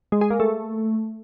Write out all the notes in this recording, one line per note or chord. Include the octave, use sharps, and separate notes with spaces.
G#3
G#4
A#3
A3